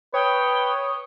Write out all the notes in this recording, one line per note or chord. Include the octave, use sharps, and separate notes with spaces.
B4 C#5 G5 D#6